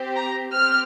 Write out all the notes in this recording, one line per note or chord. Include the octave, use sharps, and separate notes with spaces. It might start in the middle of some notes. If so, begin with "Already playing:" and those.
Already playing: C4 G4
A#5
C4 G4 F6